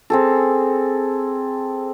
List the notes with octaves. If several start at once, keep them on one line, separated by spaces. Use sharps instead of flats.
C4 G#4 A4